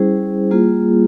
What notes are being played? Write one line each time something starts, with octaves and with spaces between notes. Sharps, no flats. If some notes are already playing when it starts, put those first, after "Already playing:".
Already playing: G3 C#4 E4 G#4 C5
G3 A#3 F4 G#4